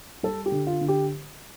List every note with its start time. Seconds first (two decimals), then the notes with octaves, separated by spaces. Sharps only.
0.23 G3 A4
0.46 G4
0.52 D3
0.67 F4
0.81 D3
0.88 G4